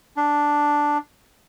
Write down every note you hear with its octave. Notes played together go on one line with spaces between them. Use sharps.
D4